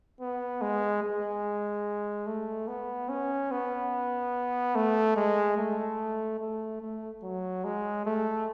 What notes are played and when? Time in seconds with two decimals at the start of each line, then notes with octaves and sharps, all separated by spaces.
0.21 B3
0.62 G#3
1.03 G#3
2.27 A3
2.68 B3
3.09 C#4
3.52 B3
4.75 A3
5.17 G#3
5.58 A3
6.40 A3
6.81 A3
7.23 F#3
7.65 G#3
8.06 A3